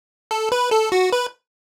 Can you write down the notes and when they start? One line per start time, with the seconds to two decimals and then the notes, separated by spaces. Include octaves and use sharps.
0.31 A4
0.52 B4
0.71 A4
0.92 F#4
1.12 B4